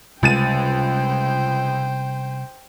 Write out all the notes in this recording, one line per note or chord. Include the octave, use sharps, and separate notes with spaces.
C#2 C3 G3 C#4 C5 G5 A6 D#7